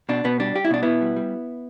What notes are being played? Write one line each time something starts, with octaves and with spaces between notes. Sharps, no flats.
B2 D4
B2 B3
G3 D4
G3 G4
E4
B2 D4
B2 B3 E4
G3
G3